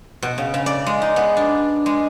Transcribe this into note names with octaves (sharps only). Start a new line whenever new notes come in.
B2
C#3
C#3
D5
G#3
D#4
B3
D4
G#3